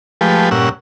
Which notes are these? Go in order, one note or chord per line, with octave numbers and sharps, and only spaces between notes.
F3 G#3 A3 G4 B4
G2 A#2 C#4 F#5 E6